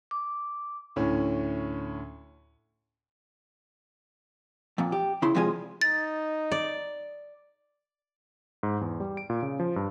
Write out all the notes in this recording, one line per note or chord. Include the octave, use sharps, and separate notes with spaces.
D6
D2 A2 C#4
F2 A#2
G4
C#3 E4 C6
C3 F3 G3 G#3 F4 G#5
D#4 A6
D5
G#2
E2
G3
D7
A#2
C#3
F3
G2